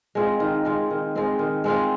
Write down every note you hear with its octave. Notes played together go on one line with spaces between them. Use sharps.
G#3 C4 F4
D#3
G#3 C4 F4
D#3
G#3 C4 F4
D#3
G#3 C4 F4